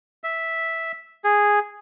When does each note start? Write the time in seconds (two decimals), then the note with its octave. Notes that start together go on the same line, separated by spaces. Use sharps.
0.24 E5
1.24 G#4